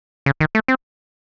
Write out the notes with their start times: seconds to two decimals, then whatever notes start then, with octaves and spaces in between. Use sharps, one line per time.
0.26 C#3
0.41 D#3
0.55 A3
0.68 C4